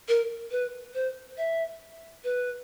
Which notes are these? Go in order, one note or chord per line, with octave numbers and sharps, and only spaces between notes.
A#4
B4
C5
E5
B4